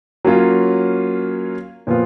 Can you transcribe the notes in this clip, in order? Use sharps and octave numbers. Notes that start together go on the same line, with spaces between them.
F#3 A#3 C#4 F4
A#2 F3 B3 F4